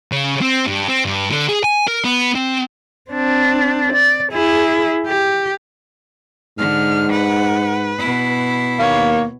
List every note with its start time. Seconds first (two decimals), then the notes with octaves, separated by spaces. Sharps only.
0.12 C#3
0.41 C4
0.66 G2
0.88 C4
1.05 G2
1.31 D3
1.49 G#4
1.64 G#5
1.88 A#4
2.04 B3
2.35 C4
3.11 C4 D4
3.93 D5
4.33 E4 G#4
5.07 G4
6.58 G#2 D3 F6
7.12 B4 F#5
7.98 B2 E4
8.79 D#2 A#3 C#5